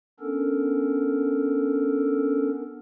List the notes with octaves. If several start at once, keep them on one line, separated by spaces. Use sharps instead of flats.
B3 C#4 D4 A4 A#4